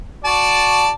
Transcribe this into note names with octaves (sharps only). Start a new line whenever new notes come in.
F#4 D5 A5